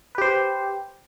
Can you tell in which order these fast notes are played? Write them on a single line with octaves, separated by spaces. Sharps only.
B4 G4 C5